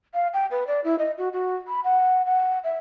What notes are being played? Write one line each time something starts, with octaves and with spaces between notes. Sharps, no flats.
F5
G5
B4
D5
E4
D#5
F#4
F#4
B5
F#5
F#5
E5